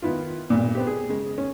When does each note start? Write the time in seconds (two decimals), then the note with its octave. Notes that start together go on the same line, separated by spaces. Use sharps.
0.02 D#3 B3 E4 F4
0.50 B1 G2 A#2
0.75 B3 C4 G4
0.87 G#4
1.09 C#3 G#3
1.38 C#4